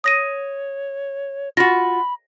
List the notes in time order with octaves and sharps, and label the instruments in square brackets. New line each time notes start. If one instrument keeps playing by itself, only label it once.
[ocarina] C#5 [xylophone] D#6 A#6 D#7
[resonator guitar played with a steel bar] F4 F#4 [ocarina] B5 [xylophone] A#6